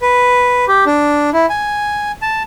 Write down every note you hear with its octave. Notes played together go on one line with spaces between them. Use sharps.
B4
G4
D4
E4
G#5
A5